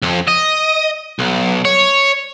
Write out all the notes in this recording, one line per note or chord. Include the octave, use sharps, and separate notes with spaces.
F2
D#5
B1
C#5